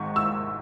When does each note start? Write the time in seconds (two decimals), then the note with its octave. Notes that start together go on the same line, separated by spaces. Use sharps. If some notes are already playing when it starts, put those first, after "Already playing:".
Already playing: G#1 G#2 D#3 C#6
0.16 E6